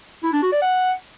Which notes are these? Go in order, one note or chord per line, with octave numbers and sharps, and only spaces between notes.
E4
D4
F#4
D5
F#5